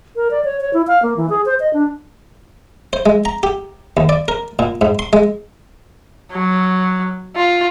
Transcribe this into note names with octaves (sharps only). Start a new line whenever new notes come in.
A#4
D5
C#5
C#5
E4
F5
A#3
E3
G#4
C5
D#5
D4
C5
G#3
A#5
G4
D#2
D5
A#4
A#2
G#2
C6
G#3
F#3
F4